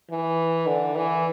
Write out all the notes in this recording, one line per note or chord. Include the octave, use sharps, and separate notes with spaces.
E3
D3
E3